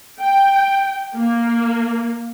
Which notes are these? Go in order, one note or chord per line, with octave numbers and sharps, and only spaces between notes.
G5
A#3